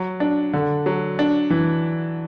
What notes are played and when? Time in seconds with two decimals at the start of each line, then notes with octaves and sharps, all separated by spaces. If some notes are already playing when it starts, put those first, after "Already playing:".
Already playing: F#3
0.20 D4
0.53 D3
0.86 F#3
1.19 D4
1.50 E3